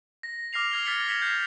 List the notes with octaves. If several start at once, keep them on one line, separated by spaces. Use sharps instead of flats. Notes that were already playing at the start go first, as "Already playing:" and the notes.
A#6
D6 F6 A#6 C7 F7
F6 G#6 G7
F6 G#6 A6 B6 C#7 F#7
G#6 B6 C#7 E7
G6 G#6 C7